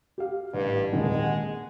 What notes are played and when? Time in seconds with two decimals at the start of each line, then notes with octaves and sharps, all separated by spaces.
0.18 G4 F5
0.53 A1 G2
0.93 D#1 F2 D#3 G#3
1.24 F#5